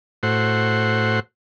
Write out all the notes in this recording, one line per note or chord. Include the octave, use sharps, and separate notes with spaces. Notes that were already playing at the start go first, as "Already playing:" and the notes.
A2 F#4 C5